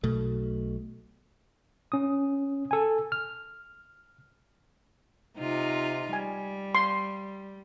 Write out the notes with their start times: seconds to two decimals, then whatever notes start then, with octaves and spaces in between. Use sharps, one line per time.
0.03 B1 B2 A3
1.92 C#4 D#6
2.71 A4 G#5
3.12 F6
5.39 C3 D#4 F4
6.13 G3 G#5
6.75 C6